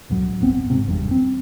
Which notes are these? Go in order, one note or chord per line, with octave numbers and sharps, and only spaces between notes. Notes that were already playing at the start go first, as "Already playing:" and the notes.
D1 C#2 A2 F#3
G1 D#2 B3 C4
D#1 G#2 C3
G1 E2 G2
C4